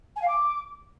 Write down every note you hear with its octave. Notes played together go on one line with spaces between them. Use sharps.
G#5
F5
D6